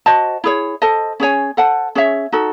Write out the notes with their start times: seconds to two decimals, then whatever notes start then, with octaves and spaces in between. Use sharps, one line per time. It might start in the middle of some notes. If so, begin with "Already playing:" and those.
0.06 F#4 C5 D#5 A5
0.44 E4 G#4 C#5
0.82 A4 C5 D#5 A5
1.20 C#4 G#4 C#5 G#5
1.57 A4 C5 F#5 A5
1.95 C#4 G#4 C#5 E5
2.32 D#4 F#4 A4